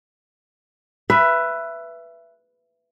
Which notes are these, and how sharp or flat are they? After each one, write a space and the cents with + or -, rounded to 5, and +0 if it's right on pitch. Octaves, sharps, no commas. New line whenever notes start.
B4 +0 E5 +20